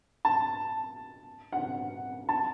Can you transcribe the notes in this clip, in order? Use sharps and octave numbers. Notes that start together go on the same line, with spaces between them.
A5
F#5
A5